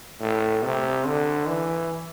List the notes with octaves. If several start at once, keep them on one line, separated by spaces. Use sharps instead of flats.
A2
C3
D3
E3